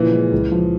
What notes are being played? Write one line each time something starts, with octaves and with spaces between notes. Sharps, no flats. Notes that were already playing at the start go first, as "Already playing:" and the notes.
Already playing: A#2 C#3 E3 F3
G#3
C#2
F3